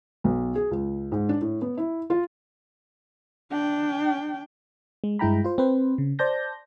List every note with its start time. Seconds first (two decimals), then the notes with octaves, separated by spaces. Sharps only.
0.24 B1
0.55 G#4
0.71 C#2
1.12 G#2
1.29 D4
1.41 A2
1.62 B3
1.77 E4
2.10 F4
3.51 D4 G5
5.04 G#3
5.19 G2 G#3 E4 G5 A#5 B5
5.44 F4 C5
5.58 C4 B4 C5
5.98 C#3
6.19 C5 D5 A5 G6 A#6